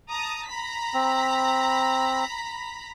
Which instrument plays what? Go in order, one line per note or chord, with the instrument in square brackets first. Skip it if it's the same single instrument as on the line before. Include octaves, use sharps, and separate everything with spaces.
[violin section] A5 A#5 D#6
A#5 B5 B6
[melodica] C4